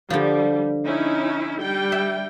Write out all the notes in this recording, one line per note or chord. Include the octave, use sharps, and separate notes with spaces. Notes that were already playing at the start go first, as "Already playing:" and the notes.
D3 F3 G3
C#4 D#4 E4
G3 G5
E5